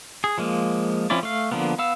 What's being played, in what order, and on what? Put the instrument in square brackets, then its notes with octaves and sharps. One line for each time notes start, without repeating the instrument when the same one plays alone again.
[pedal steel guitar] G#4
F3 G#3 A#3
F3 C4 C#4 E4 D5
A3 F5
D3 F3 A#3 B3
B3 F5 E6